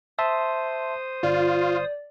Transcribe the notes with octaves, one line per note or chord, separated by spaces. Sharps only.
C5 E5 A5 C6 D#6
G1 F4 D5